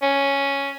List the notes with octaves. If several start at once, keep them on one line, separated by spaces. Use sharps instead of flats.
C#4